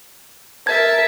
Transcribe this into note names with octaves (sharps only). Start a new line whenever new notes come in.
A#4 E5 A5 G#6